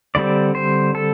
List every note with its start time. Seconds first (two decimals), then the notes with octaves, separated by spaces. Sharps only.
0.15 D3 G3 C4 D5
0.55 C5
0.95 A4